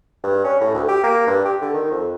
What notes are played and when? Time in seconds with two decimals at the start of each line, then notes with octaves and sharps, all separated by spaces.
0.24 G2
0.44 C#4
0.61 A2
0.74 D2
0.88 G4
1.04 A#3
1.27 G2
1.45 G4
1.62 D3
1.74 D#3
1.91 F2